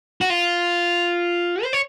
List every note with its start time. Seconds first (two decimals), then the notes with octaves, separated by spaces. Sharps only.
0.21 F#4
0.30 F4
1.63 C5
1.73 C#5